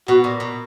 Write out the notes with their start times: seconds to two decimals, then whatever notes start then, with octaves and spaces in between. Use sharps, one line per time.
0.08 B2 F#4
0.24 A#2
0.40 B2